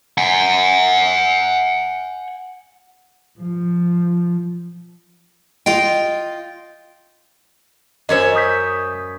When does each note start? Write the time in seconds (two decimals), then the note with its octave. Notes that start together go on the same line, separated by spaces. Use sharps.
0.18 F#5 G#5
3.40 F3
5.66 F4 D#5 G5
8.09 F#2 C5 C#5 D#5 E5
8.36 D#6 G6 B6